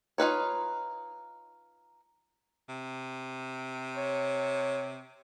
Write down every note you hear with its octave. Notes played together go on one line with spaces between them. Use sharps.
D#4 F4 B4 C#5
C3
C#5